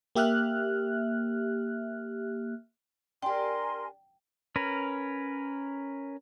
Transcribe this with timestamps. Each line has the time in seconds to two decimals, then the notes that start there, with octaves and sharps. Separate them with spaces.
0.15 A#3 G4 E5 F6 F#6
3.22 D4 G4 A#4 G5 G#5 C6
4.56 C#4 A#4 B4